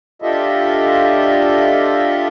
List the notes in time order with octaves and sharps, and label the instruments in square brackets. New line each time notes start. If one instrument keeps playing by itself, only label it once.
[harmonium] D4 F4 G4 A4 D#5 E5